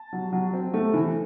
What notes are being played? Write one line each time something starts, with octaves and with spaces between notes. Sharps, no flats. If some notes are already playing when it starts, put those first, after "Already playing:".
Already playing: A5
F#3
F#3
C4
A3
E3